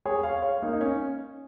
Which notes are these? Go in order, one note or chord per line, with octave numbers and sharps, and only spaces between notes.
G#4 C#5
C#5 F5
C#5 F5
A#3 D#4
D#4
C#4